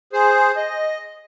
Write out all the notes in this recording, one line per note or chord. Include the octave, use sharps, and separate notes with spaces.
G#4 C5
D#5